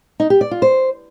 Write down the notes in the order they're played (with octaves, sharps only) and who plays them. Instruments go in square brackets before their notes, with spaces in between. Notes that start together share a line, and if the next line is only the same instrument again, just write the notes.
[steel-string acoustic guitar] D#4
G4
D5
F4
C5